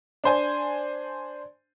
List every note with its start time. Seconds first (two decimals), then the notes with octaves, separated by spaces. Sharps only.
0.24 D4 C5 G#5